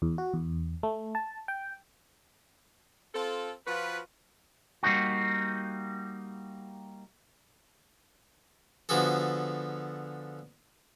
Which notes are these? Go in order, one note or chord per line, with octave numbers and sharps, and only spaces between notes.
E2
F#4
E2
A3
A5
G5
C4 F4 A4
F3 F4 F#4 B4
G3 A#3 D#4 F#4
D3 F3 B3 F#4 G#4 A4